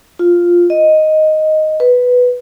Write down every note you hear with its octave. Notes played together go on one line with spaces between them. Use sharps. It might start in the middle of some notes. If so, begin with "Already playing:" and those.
F4
D#5
B4